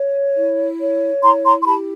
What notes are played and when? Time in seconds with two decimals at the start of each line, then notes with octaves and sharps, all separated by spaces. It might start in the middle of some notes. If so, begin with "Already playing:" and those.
Already playing: C#5
0.36 E4
0.80 C#5
1.22 E4 A#5 C6
1.44 A#5 C6
1.62 C6
1.66 G4 A5 B5